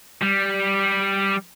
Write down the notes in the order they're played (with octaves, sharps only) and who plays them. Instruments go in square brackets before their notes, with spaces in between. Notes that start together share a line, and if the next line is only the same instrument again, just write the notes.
[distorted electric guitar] G3